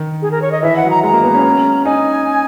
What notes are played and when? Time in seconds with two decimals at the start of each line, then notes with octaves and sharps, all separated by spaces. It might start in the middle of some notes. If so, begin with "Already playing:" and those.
Already playing: D#3
0.22 G#4
0.31 A#4
0.42 C#5
0.52 D#5
0.63 E3 E5
0.76 F#5
0.83 F#3
0.90 A#5
1.03 G#3 A#5
1.13 A#3
1.23 B3
1.34 C#4
1.85 D#4 G#5